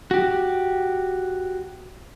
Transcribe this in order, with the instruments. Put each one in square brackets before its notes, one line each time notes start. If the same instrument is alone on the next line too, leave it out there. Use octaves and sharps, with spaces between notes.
[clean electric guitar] F#4 G4